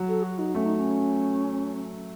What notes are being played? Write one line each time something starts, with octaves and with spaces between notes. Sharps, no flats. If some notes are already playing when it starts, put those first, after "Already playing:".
Already playing: F#3
A4
F#4
D#4
A3 C#4
D#4
D#4
C#4